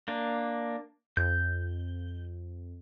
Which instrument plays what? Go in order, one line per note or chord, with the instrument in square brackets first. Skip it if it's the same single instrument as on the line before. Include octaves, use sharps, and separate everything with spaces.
[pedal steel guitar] A#3 D4
[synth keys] F2 [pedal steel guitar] G6